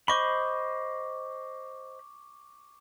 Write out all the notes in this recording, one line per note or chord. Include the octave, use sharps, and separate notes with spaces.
C5 D#5 B5 C#6 D6